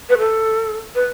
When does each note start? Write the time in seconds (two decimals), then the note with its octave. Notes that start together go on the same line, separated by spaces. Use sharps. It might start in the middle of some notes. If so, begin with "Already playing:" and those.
0.10 B4
0.18 A4
0.95 B4